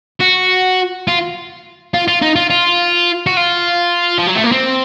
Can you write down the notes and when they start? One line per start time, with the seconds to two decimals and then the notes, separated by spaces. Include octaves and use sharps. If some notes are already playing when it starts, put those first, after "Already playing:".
0.21 F#4
1.07 F4
1.94 F4
2.08 F4
2.22 D#4
2.36 F4
2.50 F4
3.26 F#4
3.37 F4
4.18 F3
4.27 F#3
4.35 A3
4.44 A#3
4.52 C4